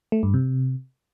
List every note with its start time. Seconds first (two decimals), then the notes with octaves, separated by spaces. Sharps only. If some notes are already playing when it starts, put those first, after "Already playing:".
0.12 A3
0.23 G2
0.34 C3